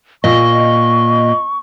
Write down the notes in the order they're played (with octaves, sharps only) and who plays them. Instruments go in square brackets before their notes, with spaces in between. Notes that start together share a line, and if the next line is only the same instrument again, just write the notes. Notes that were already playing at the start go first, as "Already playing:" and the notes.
[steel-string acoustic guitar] A#2 [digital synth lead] D#5 [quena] C#6